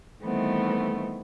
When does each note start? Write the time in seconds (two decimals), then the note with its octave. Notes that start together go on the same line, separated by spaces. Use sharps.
0.22 D#3 E3 G3 A3 B3 C4